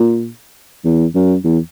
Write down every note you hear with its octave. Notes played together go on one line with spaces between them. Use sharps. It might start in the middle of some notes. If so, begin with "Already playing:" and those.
Already playing: A#2
E2
F#2
E2